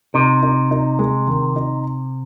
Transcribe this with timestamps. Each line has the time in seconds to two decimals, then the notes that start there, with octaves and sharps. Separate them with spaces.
0.14 C3 D#4
0.43 D#4
0.71 D#4
0.99 G#3
1.28 D#3
1.56 D#4